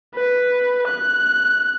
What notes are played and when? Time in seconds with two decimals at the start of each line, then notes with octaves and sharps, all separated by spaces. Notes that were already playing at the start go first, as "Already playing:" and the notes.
0.15 B4
0.88 F#6